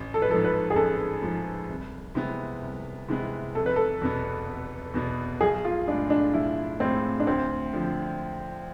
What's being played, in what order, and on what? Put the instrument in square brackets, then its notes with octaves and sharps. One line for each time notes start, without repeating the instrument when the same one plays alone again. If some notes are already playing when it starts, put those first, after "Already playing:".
Already playing: [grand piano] A1
[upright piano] A4
B4
[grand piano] F3 [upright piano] A4
[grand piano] G#2
[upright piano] B4
G#4
[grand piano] A1 [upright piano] A4
[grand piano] G#2 F3
C2
C3 E3 G#3 B3
C2
C3 E3 G#3 B3
[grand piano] F1 [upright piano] A4
[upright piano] B4
A4
[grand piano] E2 B2 B3
F1
E2 B2 B3
[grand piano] B1 [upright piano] G#4
[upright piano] F4
[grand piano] A2 G#3 [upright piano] D4
[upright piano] D4
[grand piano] B1 [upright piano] E4
[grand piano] A2 G#3 [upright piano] C4
[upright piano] D4
[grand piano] D2 [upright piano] C4
[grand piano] D3 F3